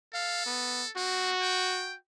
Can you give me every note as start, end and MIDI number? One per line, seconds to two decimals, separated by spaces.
0.14 0.91 69
0.14 0.46 77
0.46 0.83 59
0.96 1.30 60
0.96 1.97 66
1.42 1.96 79